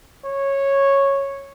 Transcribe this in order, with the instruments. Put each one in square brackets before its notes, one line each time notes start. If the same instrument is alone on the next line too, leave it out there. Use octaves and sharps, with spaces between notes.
[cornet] C#5